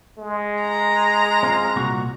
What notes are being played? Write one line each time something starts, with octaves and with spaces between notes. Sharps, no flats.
G#3
A#5
C4 F4
C2 A#2 F#4